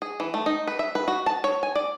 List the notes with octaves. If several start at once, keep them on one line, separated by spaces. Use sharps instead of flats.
G#4
E3
A3
D#4
B4
E5
B4
F#4
A5
C#5
G#5
D5